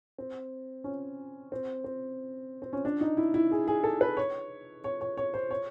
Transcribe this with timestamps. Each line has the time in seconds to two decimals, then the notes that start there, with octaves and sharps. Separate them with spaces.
0.18 C4
0.84 C#4
1.52 C4
1.84 C4
2.62 C4
2.73 C#4
2.85 D4
3.01 D#4
3.17 E4
3.34 E4
3.51 G#4
3.68 G#4
3.84 A4
4.01 B4
4.17 C#5
4.84 C#5
5.01 C#5
5.17 C#5
5.34 C5
5.51 C#5